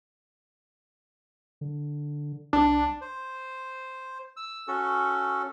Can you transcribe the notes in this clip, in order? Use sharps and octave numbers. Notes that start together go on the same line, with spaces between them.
D3
C2 D4
C5
E6
C#4 F#4 A4